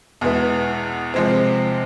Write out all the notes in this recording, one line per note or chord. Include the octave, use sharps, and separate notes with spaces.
E2 B2 G#3 B3 E4
C3 F3 G#3 C4